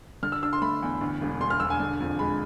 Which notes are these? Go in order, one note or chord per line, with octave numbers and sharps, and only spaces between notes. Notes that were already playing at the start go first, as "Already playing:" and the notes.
D3 F6
E6
D4 E6
C6
A3 B5
E2
D2
E1
D3 C6
F6
E1 E6
G#5
D3
F2
G#3 B5